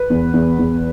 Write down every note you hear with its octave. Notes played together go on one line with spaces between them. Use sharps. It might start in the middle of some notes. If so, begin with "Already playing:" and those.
Already playing: B4
E2
E2
E2